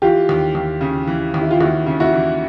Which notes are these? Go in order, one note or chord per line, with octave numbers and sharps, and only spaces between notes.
E3 F4 G4
D#2
D#2
C#3
E3
D#2
E4
F4
D#2 E4 F#4
C#3
E4 F#4
E3